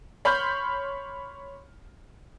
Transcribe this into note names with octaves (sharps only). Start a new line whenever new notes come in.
C#5 B5 C6 F6 G6